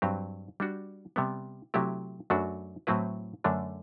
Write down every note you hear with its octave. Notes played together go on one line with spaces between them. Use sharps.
G2 F#3 C4 G4
G3 D4 F#4
C3 G3 B3
C3 F#3 A3 E4 G4
F#2 F#3 A3 D4 F#4
A2 F#3 C4 E4 B4
F#2 D3 A3 D4